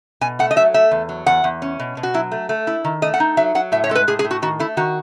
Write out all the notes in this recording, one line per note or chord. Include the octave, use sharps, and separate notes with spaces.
B2 G#5
A3 F#5
D#5
F#3 E5
A3 E5
E2
F#3
E2 F#5
E2
C#4
B2
B2
F#4
F#3 E4
A3
A3
E4
D#3
A3 D#5
F#5
D#4
F#3 E5
F#3 F#5
A2 E5
C#5
G#3 A4
B4
A2 G#4
G#4
A2
F#4
D#3 F#4
A3 E4
D#3 F#4